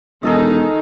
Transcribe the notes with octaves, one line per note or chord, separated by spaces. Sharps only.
E1 D#3 D#4 G#4 A4 D#5